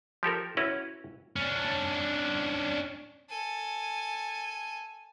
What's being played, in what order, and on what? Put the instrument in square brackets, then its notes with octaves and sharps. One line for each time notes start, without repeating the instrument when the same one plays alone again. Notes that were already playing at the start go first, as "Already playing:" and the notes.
[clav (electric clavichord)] F3 G4 A4 A#4
C#4 E4 F#4 B4 C#5
[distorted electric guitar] C#4 D4
[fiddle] A4 G#5